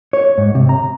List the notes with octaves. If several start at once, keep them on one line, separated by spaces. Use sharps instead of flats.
C#5
G#2
C3
A#5